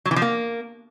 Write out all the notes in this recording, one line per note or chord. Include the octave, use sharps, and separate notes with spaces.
F#3
E3
F3
A#3